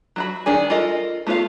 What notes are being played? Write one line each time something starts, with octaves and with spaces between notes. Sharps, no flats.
F#3 F#4 B5
D#3 D4 G#4 G#5
F4 A4 A#4 D#5
A3 B3 F4 C#5 F5